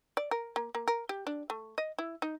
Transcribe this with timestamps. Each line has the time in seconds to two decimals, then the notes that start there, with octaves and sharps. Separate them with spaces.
0.17 D5
0.31 A#4
0.56 A#3
0.75 A#3
0.88 A#4
1.09 G4
1.27 D4
1.50 A3
1.78 D#5
1.99 E4
2.22 D#4